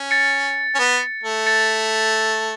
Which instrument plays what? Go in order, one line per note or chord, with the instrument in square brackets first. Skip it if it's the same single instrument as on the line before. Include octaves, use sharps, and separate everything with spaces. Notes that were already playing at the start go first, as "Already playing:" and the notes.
Already playing: [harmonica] C#4
[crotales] A6 C#7
[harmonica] C#4
B3
A3
[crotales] A6 C#7